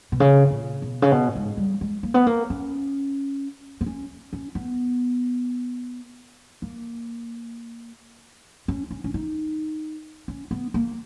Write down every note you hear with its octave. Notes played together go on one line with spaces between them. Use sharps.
B2
C#3
A#2
B2
C#3
B2
G#2
G3
G#3
A#3
B3
A#3
C#4
B3
C#4
C#4
B3
A#3
C#4
C#4
C#4
D#4
C#4
B3
A#3